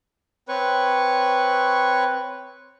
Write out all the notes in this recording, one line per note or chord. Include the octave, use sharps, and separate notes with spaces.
C4 B4 C#5 C#6